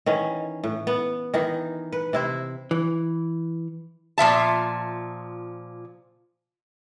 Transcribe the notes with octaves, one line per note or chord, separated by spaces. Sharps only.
D#3 E3 C#4
A2
B3
D#3 E3 D#4
B4
C3 E4 C5
E3
A#2 F3 E5 A5